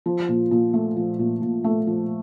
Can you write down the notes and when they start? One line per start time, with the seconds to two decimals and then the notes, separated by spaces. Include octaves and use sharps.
0.06 F3
0.29 A#2
0.51 A#2
0.74 A3
0.96 F3
1.19 A#2
1.42 A#2
1.64 A3
1.87 F3